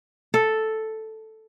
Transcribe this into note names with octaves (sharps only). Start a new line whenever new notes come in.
A4